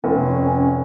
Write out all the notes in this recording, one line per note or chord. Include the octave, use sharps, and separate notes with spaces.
F1 C#4